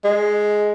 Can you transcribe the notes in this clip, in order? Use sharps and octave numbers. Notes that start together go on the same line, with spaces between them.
G#3